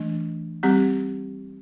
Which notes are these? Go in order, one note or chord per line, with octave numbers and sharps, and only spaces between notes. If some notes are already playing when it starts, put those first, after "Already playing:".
Already playing: E3 A3 D4
G3 C4 G4